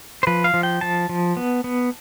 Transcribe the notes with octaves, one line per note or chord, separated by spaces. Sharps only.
C5
F3 B4
F5
F3
G5
F3 A5
F3
B3
B3